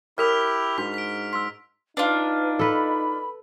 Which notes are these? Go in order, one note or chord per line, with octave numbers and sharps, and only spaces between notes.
E4 G4 A#4 C#5 F6 B6 F7
G#2 D4 F#4 B5 B6
B6 D7
C6 E6 B6
D4 D#4 F4 B4
A4 B4 B5